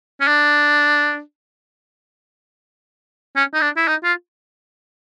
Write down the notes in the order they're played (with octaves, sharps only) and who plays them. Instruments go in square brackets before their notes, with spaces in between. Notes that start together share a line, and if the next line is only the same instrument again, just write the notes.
[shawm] C#4
D4
C#4
D#4
D4
E4
D#4
F4